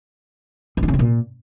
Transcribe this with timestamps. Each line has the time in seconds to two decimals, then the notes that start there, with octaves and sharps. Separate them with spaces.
0.77 G2
0.83 D3
0.88 C#3
0.94 A2
0.99 A#2